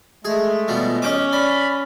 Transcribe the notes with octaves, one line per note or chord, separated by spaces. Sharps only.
G#3 A3 G#4
B2 F3 G3
C#4 D#5 G5 D6
D5 B5